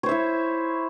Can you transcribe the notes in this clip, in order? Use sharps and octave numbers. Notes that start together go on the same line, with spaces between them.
E4 C5 C#5 E5